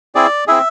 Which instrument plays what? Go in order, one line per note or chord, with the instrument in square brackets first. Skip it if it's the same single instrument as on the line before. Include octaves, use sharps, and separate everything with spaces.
[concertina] C4 E4 G#4 D5
C4 E4 G#4 E5